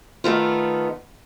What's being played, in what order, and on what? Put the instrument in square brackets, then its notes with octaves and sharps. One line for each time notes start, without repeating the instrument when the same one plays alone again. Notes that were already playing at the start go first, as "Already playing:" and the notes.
[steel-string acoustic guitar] D#3 A3 B3 F4